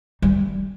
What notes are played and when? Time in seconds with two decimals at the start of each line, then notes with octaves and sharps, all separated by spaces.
0.22 G3